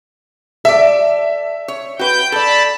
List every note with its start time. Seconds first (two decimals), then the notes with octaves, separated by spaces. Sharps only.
0.65 A4 D5 E5
1.68 C#5
1.99 F#4 B4 G5 G6
2.32 A4 D5 A5 B5